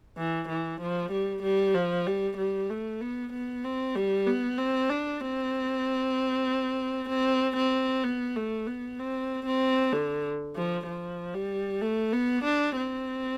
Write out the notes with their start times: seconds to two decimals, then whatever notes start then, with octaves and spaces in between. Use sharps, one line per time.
0.17 E3
0.49 E3
0.81 F3
1.12 G3
1.43 G3
1.74 F3
2.07 G3
2.37 G3
2.70 A3
3.01 B3
3.33 B3
3.64 C4
3.95 G3
4.27 B3
4.58 C4
4.89 D4
5.21 C4
7.09 C4
7.56 C4
8.04 B3
8.36 A3
8.67 B3
8.99 C4
9.46 C4
9.92 D3
10.56 F3
10.87 F3
11.34 G3
11.82 A3
12.13 B3
12.44 D4
12.76 C4